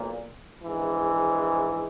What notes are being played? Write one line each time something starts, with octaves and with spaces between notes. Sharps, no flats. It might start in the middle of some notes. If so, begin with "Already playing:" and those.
Already playing: B1 A#2 A#3
A#1 G#2 E3